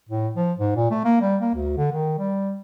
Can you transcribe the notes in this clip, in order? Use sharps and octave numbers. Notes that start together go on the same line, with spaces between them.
A2
F3
G#2
A#2
A3
A#3
G3
A#3
D2
D3
D#3
G3